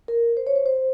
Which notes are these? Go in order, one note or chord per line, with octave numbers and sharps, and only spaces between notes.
A#4
C5
C#5
C5
C5